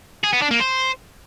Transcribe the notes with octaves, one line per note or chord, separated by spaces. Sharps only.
G#4
B3
D4
A#3
C5